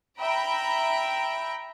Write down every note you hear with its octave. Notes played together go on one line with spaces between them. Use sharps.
E5 G5 A#5 B5 D7